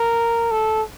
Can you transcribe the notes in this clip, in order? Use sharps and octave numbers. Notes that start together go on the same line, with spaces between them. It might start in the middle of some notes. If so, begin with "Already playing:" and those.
Already playing: A#4
A4